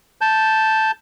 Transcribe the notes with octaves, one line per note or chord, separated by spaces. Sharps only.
A5 G6